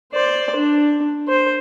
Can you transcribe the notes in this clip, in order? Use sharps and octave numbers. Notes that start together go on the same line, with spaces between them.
C5 D5
D4
C5